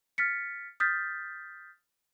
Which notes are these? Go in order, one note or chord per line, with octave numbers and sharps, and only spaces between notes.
F6 A6 B6 C#7
D#6 F6 G6 A6 B6